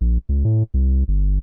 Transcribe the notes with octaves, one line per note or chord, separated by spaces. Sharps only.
A#1
C#2
A2
C2
G1